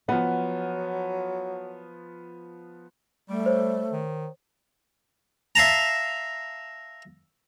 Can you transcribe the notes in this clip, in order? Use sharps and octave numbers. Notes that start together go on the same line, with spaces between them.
F3 F#3 B3 F#5
G3 A3
C5 C#5
D#3
E5 F5 A5 A#5